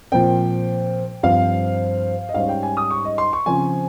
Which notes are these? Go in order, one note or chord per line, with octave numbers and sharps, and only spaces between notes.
A#2 F3 C4 G5
G2 F3 C4 F5
D#5
G#2 G3 C#4 F5
G5
G#5
D#6
C#6
D#5
C6
C#6
C#3 F3 C4 G#5